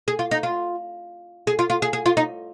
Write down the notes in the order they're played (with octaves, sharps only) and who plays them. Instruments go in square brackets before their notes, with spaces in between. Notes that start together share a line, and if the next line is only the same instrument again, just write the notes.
[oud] G#4
F4
D#4
F4
G#4
F4
F4
G#4
G#4
F4
D#4